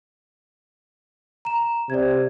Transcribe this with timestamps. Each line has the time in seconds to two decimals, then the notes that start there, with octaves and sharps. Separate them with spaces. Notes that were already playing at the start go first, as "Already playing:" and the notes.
1.45 A#5 E7
1.90 C3 D5 G#6